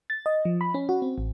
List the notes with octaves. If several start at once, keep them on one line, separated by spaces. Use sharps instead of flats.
A6
D#5
F3
B5
C#4
F#4
C4
A1